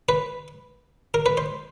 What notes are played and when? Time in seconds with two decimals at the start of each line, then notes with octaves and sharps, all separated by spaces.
0.09 B4
1.14 A#4
1.26 B4
1.37 C5